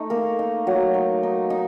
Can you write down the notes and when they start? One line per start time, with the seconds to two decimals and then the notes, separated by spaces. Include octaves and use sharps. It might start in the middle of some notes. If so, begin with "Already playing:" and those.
Already playing: A3 D#4
0.10 A#3 A#4
0.39 D#4
0.67 F#3
0.94 D#4
1.23 D#4
1.50 D#4